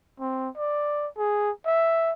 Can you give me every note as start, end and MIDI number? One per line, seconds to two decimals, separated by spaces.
0.20 0.49 60
0.57 1.07 74
1.18 1.51 68
1.66 2.13 76